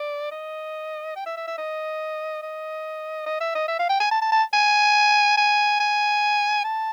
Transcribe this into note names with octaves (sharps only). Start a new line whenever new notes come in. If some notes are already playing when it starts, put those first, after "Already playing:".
Already playing: D5
D#5
G5
E5
E5
E5
D#5
D#5
D#5
E5
D#5
E5
F5
G5
G#5
A5
A5
A5
G#5
G#5
G#5
A5